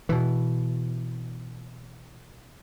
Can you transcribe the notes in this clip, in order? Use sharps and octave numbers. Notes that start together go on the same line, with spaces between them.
B2 E3